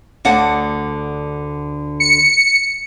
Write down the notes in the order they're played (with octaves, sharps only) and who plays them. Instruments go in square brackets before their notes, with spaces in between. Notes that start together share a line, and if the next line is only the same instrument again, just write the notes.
[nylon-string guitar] D2 D3 F#5
[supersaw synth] C#7